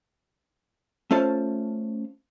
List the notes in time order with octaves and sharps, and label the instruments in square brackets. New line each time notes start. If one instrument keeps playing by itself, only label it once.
[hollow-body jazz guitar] A3 C#4 F4 C5 A5